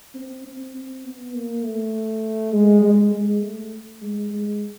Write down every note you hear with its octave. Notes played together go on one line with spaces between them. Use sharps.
C4
C4
C4
B3
A#3
A3
G#3
G#3
G#3
A3
G#3
G#3